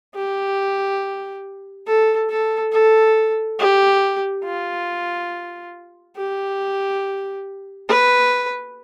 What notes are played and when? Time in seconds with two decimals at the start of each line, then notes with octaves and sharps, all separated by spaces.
0.14 G4
1.87 A4
2.29 A4
2.72 A4
3.59 G4
4.45 F4
6.16 G4
7.88 B4